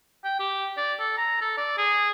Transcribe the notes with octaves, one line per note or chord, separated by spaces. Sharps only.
G5
G4
D5
A4
A#5
A4
D5
G#4